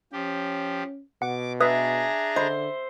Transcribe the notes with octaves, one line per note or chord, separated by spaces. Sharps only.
F3 C#4 G4
B2 F#5 D6
D4 G#4 B4 E5 A#5 D#6 G#6
D3 C5 D#5 B5